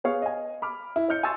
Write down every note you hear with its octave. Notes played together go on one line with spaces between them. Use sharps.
B3 G#4 C#5 F5
D#5 G#5
B5 D6 F6
E4
C#5 D#5 F6 G6 C#7
G#5 A5 C6 C#6 E6 A6